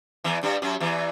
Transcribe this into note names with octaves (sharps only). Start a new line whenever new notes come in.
E2 E3
G2 G3
F#2 F#3
E2 E3